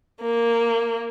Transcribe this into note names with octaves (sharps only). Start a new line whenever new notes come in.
A#3